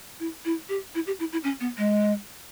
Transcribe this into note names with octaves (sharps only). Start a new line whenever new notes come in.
E4
E4
G4
E4
G4
E4
E4
C#4
B3
G#3